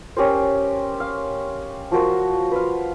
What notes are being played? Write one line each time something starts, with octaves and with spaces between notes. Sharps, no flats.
C#4 G4 A#4 C5
F5
F3 F#4 A#4 C5
B4 F5